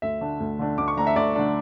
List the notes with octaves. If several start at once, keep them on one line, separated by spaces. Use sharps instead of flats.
D2 E5
D3 A3 D4
D2
D3 A3 D4
D2 D6
C#6
D3 A3 D4 A#5
E5
D2 D5
D3 A3 D4